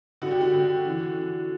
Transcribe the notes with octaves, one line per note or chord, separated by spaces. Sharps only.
D3 F#4
G4
F#4
D3
E3
E3